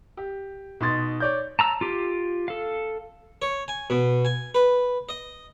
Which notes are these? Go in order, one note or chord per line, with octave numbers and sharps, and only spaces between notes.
G4
B2 D#4 C6 A6
C#5 D5 G6
A5 A#5 E6
F4 G4
A4 F5
C#5
G#5
B2
G#5
B4
D#5